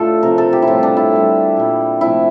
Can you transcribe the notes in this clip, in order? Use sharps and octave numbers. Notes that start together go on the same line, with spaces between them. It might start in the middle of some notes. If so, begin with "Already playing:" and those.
Already playing: A2 D3 A3 F4 A4
C3 F3 A3 A#4
A4
G4
E4
A2 G3 F4
D4
E4
D3 G3
A#2 G3
C3 F3 A3 E4